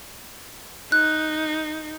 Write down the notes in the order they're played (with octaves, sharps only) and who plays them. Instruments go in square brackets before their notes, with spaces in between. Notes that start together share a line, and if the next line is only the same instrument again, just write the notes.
[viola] D#4 [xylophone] F#6